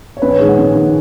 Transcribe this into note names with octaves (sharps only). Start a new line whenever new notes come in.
C#5
A#1 B4
C#5
G#2 D#3 G#3 G#4
F#5
A#1
G#2 D#3 G#3